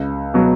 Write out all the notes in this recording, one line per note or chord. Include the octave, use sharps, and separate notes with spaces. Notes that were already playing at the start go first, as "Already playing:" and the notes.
Already playing: C#2
B2 F#3